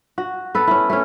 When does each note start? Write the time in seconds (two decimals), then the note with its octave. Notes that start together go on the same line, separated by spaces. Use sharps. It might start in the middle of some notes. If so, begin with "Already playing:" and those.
0.18 F#4
0.55 B3 A4 B4
0.67 C#4 E4
0.90 A3 C#4